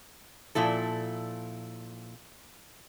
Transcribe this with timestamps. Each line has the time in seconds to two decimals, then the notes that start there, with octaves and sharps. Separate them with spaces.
0.55 A#2 F3 E4 A4